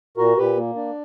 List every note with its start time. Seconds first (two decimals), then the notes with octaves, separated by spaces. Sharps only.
0.17 A#2 F#4 A#4
0.37 A#2 G4 B4
0.57 A#3
0.76 D4